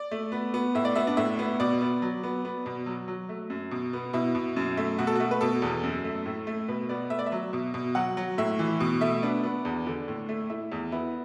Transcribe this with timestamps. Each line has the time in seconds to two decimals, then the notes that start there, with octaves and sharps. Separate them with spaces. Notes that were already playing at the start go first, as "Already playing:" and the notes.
Already playing: D5
0.11 A3
0.32 B3
0.54 B3
0.75 A2 E5
0.85 D5
0.95 B3 E5
1.07 D4
1.17 A2 E5
1.39 B3
1.60 B2 D5
1.81 B3
2.02 F#3
2.23 B3
2.45 B3
2.66 B2
2.86 F#3
3.08 F#3
3.29 A3
3.50 F#2
3.71 B2
3.93 B3
4.13 B2 E4
4.35 B2
4.56 F#2
4.77 A3
4.98 B2 F#4
5.07 A4
5.15 A3 F#4
5.31 B4
5.41 B2 A4
5.62 E2
5.83 F#2
6.04 A3
6.26 A2
6.47 A3
6.68 B2 B4
6.89 B3 D5
7.10 A3 E5
7.19 D5
7.26 E5
7.32 F#3
7.53 B2
7.74 B2
7.95 F#3 F#5
8.17 F#3
8.38 A2 E5
8.59 E3
8.80 B2
9.01 A3 E5
9.23 B3 D4
9.44 B3
9.65 E2
9.86 D3
10.08 A2
10.29 A3
10.50 A3 E4
10.72 E2
10.92 B3 E4